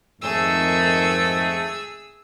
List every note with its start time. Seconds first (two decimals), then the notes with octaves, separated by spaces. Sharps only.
0.21 F2 G#2 D#3 A3 G#4 E6